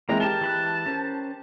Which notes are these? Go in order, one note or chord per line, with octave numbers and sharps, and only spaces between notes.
E3 G#3 A#3 C4 A#5
G4 A#4 A5 E7 G7
E3 B5 F#6
C#4 A#4 C5